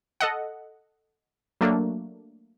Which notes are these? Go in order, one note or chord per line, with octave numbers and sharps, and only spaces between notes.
A4 D#5 F#5
F#3 A3 A#3 D4